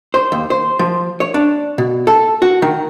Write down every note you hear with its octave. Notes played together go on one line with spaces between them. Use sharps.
C5
D#2
C5
F3
C#5
D4
B2
A4
F#4
D#3